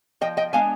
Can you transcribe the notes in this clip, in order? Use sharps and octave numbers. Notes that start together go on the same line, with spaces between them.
F3 D#5 G5
D#5 G5
G#3 B3 D4 F5 G#5